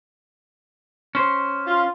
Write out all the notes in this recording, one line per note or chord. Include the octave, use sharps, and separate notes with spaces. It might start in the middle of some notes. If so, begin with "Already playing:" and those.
C#4 C5
F4